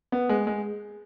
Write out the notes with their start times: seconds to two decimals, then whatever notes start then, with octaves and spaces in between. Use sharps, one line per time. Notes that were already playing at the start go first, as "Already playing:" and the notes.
0.12 B3
0.29 G#3
0.47 G#3